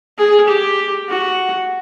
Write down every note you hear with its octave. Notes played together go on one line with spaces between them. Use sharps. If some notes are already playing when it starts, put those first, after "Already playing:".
G#4
G4
F#4